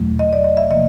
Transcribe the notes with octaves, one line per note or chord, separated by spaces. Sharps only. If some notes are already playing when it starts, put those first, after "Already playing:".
Already playing: E2 B2 F#3 A3
D#5
D5
D#5
E5
C3 F3 A#3 D#5